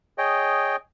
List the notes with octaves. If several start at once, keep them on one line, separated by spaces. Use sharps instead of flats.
G#4 C#5 D#5 G5